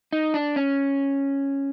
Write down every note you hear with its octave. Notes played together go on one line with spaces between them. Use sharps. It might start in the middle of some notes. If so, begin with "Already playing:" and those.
D#4
D4
C#4